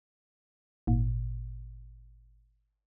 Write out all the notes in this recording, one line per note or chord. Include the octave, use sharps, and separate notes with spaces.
G#1 A#2